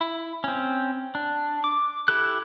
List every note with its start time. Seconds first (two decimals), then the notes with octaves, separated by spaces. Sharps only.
0.01 E4
0.44 C4 C#4
1.15 D4
1.64 D6
2.08 E4 G4 A4 F#6